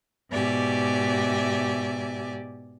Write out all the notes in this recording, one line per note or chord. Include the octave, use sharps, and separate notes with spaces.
G#2 B2 G4 D5 E5 G#5